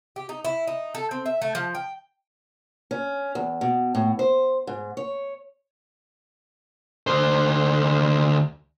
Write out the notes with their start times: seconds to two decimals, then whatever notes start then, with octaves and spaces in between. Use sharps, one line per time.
0.16 G4
0.29 D#4
0.45 E4
0.67 D#4
0.95 A4
1.11 C4
1.26 E5
1.42 A3
1.55 F3
1.75 G5
2.91 C#4
3.35 E2
3.61 B2
3.95 A2
4.19 C5
4.67 G#2
4.97 C#5
7.07 D2 C5